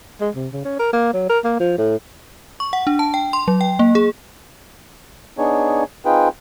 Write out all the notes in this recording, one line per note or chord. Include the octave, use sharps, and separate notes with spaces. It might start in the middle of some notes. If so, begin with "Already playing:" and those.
G#3
C3
C#3
C#4
A#4
A#3
F#3
A#4
A#3
F3
A2
C#6
F#5
D4
A5
G5
C6
F#3
G5
A#3
G#4
B3 D4 D#4 G#4 C#5
C4 D#4 F4 G#4 B4 G5